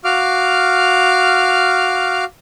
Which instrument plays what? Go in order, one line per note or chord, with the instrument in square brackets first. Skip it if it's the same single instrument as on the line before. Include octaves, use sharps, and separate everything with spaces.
[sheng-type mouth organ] F#4 F5 D6 F6